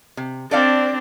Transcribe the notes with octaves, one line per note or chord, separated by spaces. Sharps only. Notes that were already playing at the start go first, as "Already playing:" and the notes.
C3
C4 D4 A4 D5 F5